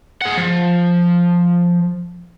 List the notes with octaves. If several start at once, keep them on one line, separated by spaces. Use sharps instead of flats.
G#4 F#5
F3